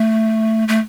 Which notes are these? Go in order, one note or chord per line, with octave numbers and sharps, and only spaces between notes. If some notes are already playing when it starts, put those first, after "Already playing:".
Already playing: A3
A3